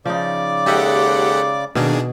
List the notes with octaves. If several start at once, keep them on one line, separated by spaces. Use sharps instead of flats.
C#3 F3 D#4 D5 D6
D#2 G#3 G4 A4 D#5 E5 F#5 G5
B2 D#3 A#3 D4 G#4